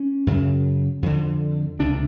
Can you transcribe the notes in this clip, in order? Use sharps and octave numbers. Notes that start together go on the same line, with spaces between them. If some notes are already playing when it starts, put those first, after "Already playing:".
Already playing: C#4
F#2 C#3
F2 D3
C#2 C3 D4